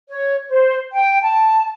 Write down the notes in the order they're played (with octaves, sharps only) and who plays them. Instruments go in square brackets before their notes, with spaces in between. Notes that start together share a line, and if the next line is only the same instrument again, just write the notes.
[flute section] C#5
C5
G5
A5